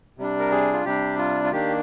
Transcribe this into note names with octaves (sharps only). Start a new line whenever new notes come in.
C3 G3 D4
A#4
G#4
F4
C3 G3 D4 G4
F4
F4
D#3 A#3 D4 G4